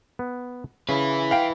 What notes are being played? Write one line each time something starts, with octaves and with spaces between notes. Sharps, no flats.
B3
C#3 E4 B4
F5 G5